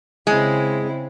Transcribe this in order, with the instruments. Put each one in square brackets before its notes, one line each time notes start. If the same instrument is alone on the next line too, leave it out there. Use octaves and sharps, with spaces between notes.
[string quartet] C#3 C4 E4 [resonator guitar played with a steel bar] G#3